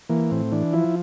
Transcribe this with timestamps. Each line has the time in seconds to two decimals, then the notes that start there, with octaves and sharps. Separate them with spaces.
0.09 E3 A#3
0.31 A2 C4
0.52 E3 D4
0.73 F3 E4